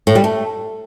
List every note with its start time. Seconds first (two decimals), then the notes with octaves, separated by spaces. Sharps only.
0.07 A2
0.15 G3
0.24 A3